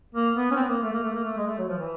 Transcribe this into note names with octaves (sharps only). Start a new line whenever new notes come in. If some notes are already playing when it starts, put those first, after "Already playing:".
A#3
B3
C#4
C4
B3
A#3
A3
A#3
A3
A#3
A3
G#3
A3
F#3
F3
E3